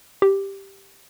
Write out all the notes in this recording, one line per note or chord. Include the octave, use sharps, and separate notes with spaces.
G4